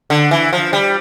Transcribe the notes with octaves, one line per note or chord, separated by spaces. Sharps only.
D3
E3
F3
G3